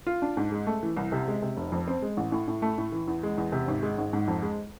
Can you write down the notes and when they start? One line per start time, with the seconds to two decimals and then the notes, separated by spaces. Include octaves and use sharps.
0.07 F4
0.22 D4
0.37 G#2
0.52 G#3
0.67 A3
0.83 E3
0.97 C2
1.12 C3
1.28 G#3
1.42 C3
1.57 F1
1.72 F2
1.88 C4
2.02 G#3
2.17 A1
2.32 A2
2.48 A2
2.62 A3
2.78 A2
2.92 E3
3.08 E2
3.23 G#3
3.38 E2
3.52 C3
3.68 G#1
3.82 G#3
3.98 G#1
4.13 G#2
4.28 F2
4.42 G#3